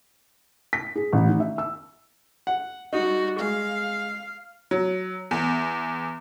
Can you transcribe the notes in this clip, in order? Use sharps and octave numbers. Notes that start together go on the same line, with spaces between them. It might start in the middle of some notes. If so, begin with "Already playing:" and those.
B6
G#4
A1
D#3
E5
E6
F#5
G3 D#4 F#4
G#3 F5
F#3
E2